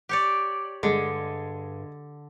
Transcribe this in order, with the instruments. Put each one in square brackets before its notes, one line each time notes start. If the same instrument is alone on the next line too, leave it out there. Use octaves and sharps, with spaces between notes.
[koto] G4 C#5 D5
[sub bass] G2 [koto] D3 [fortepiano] G#3